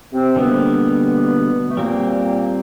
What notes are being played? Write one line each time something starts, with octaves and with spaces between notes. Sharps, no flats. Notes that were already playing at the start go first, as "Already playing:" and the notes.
C3 C4
B2 D3 G3 A#3 B3
A3
A#2 G3 A#3 C4